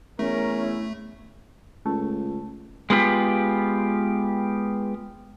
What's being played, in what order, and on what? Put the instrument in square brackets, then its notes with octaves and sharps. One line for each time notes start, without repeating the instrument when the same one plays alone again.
[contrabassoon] E2 [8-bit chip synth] A3 [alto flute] C#4 [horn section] A#4
[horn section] E4
[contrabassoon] C#2 [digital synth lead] A3
[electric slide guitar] G#3 B3 F4 G4